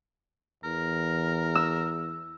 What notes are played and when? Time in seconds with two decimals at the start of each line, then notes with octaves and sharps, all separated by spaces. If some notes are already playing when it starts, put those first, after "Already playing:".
0.64 E2 A#4
1.55 E6